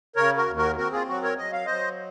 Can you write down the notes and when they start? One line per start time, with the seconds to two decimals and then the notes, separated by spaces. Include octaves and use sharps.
0.16 C#3 A#4 C#5
0.37 F#4 A#4
0.47 D#2
0.56 F#4 A#4
0.77 C4 F#4 A#4
0.92 F4 G#4
1.08 F#3 F#4
1.23 A#4 C#5
1.38 F#3 D#5
1.53 F5
1.66 F#3 C5 D#5